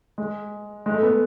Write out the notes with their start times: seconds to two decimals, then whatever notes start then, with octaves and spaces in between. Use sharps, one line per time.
0.18 G#3
0.86 G#3
0.94 A3
1.03 B3